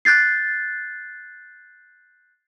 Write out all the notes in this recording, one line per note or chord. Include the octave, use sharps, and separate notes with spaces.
F#6 G6 A6 C7